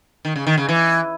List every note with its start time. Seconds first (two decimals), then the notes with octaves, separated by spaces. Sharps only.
0.25 D#3
0.36 C#3
0.47 D#3
0.58 C#3
0.69 E3